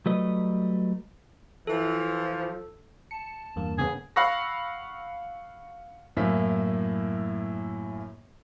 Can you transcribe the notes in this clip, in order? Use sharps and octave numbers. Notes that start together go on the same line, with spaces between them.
F#3 G3 A3 B4 D#5
E3 F3 A4
A5 C#7
E2 G2 A#3
C#3 B3 G#4
F5 F#5 B5 C#6 E6 A#6
F#2 A2 A#3 E4 B6